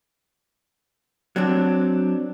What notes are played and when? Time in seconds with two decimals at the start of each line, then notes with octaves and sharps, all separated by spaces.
1.36 F#3 C4 D4